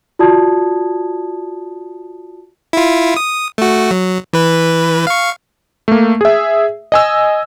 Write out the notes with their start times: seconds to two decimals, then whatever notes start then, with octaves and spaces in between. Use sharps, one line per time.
0.19 F4 F#4 D5 A5 D#6 G#6
2.73 E4 F4
3.16 D#6
3.58 A3 F#4
3.91 F#3
4.33 E3 B4
5.07 F5 C#6
5.88 A3 A#3
6.21 G#4 E5
6.92 D#5 G#5 E6